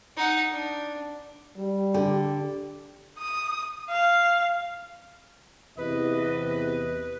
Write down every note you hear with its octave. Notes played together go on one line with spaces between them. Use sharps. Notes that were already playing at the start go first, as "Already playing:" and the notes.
D#4 F#5
D4
G3
D3 G4
D#6
F5
E2 C3 B4 D#5